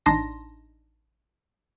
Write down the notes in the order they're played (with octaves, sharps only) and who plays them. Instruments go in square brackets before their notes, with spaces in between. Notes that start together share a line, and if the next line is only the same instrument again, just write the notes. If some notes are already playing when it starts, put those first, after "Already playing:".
[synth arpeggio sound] A1 D4 D#4 A5 C6 A#6